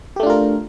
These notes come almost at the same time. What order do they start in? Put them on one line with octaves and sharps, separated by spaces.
G4 A3 D4 F4 A#4